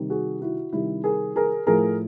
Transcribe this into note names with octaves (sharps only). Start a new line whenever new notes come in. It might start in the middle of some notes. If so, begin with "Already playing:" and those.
Already playing: C3 D#3 G3
F#4 G#4
E4 F#4
C3 D#3 G3 E4
G#4 A#4
G#4 A#4
A2 F3 A3 G#4 A#4